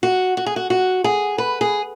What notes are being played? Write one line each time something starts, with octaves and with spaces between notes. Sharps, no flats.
F#4
F#4
G#4
F#4
F#4
G#4
B4
G#4